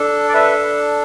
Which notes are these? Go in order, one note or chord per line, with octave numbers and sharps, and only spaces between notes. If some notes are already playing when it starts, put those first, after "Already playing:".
Already playing: D4 A4
D5
B4 E5